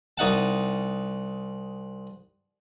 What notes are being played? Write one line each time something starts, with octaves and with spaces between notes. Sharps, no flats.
C2 D#4 F#5 A5